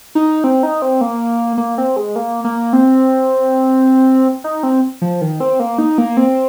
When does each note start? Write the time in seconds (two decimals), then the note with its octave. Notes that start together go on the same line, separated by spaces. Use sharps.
0.15 D#4
0.44 C4
0.63 D#4
0.82 C4
1.01 A#3
1.58 A#3
1.78 C4
1.96 G#3
2.16 A#3
2.44 A#3
2.73 C4
4.44 D#4
4.63 C4
5.02 F3
5.21 D#3
5.40 C4
5.60 A#3
5.78 D#4
5.98 A#3
6.17 C4